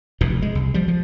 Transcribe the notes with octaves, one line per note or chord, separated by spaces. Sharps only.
F1 E2 B2
G#3
C2
F3 G3
F3